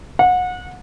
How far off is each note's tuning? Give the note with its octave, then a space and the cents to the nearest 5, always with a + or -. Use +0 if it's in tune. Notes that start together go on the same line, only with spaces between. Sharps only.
F#5 -30